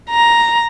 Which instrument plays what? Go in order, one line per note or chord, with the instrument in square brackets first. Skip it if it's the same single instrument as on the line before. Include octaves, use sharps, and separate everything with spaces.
[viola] A#5